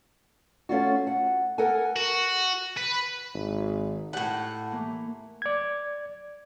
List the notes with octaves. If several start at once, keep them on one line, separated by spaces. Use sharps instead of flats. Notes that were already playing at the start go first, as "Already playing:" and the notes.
A3 C#4 F4 F#4
F#5
A4 A#4 F#5 G#5
F#4
B4
G#1
A2 D#4 G4 F#5 A5
E3 A3 A#3
D5 G#6